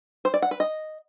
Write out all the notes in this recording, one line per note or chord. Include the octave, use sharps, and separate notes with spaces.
C5
D5
F#5
B4
D#5